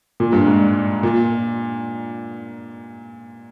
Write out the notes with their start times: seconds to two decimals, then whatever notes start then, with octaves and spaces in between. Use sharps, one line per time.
0.20 A#2
0.33 G2
0.46 G#2
1.03 A#2